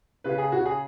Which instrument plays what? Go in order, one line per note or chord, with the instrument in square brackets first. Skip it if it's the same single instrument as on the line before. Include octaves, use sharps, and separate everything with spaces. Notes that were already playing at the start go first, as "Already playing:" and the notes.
[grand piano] C#3 B4
G#4
C#3 F#4
G#4